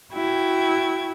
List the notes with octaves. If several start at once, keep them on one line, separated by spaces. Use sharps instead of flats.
E4 F#4 G5 G#6